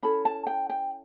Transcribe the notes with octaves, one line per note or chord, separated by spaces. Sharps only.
C#4 E4 A4 B5
A5
G5
G5